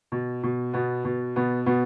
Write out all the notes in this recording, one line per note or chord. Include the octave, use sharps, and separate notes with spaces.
B2
B2
B2 B3
B2
B2 B3
B2 B3